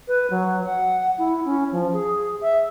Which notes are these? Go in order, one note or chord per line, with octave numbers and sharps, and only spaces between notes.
B4
F#3
F#5
E4
C#4
F3
G#4
E5